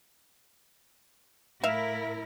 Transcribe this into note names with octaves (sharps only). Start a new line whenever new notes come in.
A2 E4 A#4 E5 F5